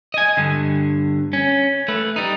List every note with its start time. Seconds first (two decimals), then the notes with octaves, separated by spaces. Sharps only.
0.14 D#5 G#5
0.37 G2 D3
1.33 C#4
1.88 A3 B4
2.16 G3 D#4